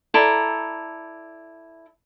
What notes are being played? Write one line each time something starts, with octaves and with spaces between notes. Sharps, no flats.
E4 A4 D5 A#5